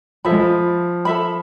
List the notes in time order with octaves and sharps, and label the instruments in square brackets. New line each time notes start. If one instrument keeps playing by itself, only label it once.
[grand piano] F3 [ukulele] A4 E5 B5
[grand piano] G#3
F3
[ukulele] A4 E5 B5